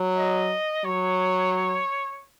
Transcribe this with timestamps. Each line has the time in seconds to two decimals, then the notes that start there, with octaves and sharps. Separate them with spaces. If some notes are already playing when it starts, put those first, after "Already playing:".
Already playing: F#3
0.16 D#5
0.85 F#3 C#5